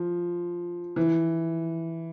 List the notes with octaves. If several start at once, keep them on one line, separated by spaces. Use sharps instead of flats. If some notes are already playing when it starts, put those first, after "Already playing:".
Already playing: F3
E3